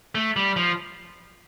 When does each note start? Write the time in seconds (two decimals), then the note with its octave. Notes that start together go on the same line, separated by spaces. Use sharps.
0.15 A3
0.36 G3
0.56 F3